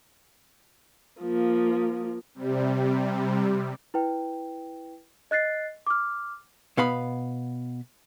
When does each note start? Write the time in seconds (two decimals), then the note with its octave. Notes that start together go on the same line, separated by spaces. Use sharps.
1.21 F3 A#3
2.35 C3 G3
3.94 E4 B4 G5
5.31 D#5 F#6 A6 C7
5.87 D6 F6
6.77 B2 B3 F5 B5